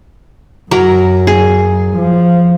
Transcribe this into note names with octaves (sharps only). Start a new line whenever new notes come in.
F#2 F#3 A#4
G#4
F3